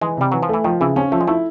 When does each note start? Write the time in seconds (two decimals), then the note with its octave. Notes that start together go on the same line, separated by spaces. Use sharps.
0.01 E3 G#3
0.17 C3 G3
0.32 E3 F#3
0.43 F3
0.49 E3 A3
0.64 D#3 F3
0.80 C#3 E3
0.96 F3 C#4
1.12 F3 A3
1.21 G#3
1.28 A3 E4